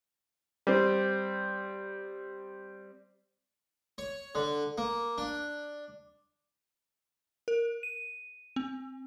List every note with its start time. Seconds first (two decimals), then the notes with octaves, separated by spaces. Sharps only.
0.67 G3 C4
3.98 C#5
4.35 D3
4.78 A#3
5.18 D4
7.48 A#4
7.83 D#7
8.56 C4